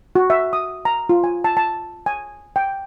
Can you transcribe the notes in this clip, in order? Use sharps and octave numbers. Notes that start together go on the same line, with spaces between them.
F#4
E5
D#6
A#5
F4
G#5
A5
A5
G#5
G5